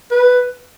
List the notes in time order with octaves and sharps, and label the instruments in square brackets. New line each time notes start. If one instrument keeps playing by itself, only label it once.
[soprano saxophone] B4